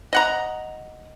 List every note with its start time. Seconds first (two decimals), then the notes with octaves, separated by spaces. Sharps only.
0.13 D#5 F#5 A#5